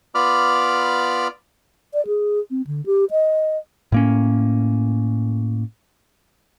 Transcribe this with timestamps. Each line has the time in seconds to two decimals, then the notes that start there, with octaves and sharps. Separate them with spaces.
0.15 B3 F4 D5 B5 D6 F6
1.94 D5
2.07 G#4
2.50 C4
2.67 D3
2.86 G4
3.11 D#5
3.92 A2 A#3 C#4